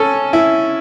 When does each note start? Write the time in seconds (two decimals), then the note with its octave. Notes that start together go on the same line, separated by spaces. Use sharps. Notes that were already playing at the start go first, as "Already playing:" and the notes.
Already playing: C#4 A4
0.33 E4